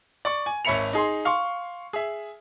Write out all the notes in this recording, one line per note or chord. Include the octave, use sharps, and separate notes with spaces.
D5 C#6
G#5
G#1 C#5 E5 B5 C#7 F7
D#4 G#4 C6
F5 C6 C#6
G#4 E5